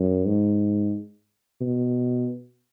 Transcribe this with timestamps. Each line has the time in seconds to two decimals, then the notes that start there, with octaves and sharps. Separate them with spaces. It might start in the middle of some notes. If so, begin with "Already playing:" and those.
Already playing: F#2
0.26 G#2
1.61 B2